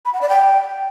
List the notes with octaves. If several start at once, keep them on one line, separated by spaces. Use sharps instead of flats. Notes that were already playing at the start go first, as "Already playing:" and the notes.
B5
F#5
D5
G5